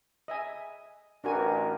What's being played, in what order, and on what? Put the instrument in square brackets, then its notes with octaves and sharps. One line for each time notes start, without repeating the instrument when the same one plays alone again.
[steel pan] D#5 E5 G#5
[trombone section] A1 [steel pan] D4 F#4 G#5 [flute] A#4